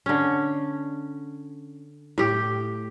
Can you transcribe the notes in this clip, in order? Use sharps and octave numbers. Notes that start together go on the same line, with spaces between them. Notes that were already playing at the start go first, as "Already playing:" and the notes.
D3 C#4
A2 G4